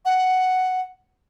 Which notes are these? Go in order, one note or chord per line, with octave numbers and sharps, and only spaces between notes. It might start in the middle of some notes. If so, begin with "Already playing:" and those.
F#5